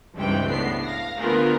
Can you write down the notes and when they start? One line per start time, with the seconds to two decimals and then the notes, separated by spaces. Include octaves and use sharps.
0.16 C#2 G2 C3 E3 G5
0.47 A2 B3 D4 C7
0.83 F5 A#6
1.18 D3 A3 B3 F4 G#4 A#4